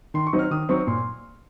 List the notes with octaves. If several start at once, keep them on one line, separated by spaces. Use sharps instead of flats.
D#3 C6
C#6
F#3 C4 D#4
F6
D#3 D#6
F#3 C4 D#4 C#6
A#2 C6